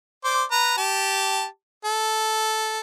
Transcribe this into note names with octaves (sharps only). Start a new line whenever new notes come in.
C5 D5
B4 A#5
G4 A5
A4